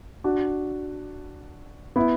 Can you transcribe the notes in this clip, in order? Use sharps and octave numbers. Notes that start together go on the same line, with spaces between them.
D4 F#4
B3 E4